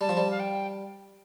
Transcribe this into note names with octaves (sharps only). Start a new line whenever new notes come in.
G3 A5
F3
G3
F5
G5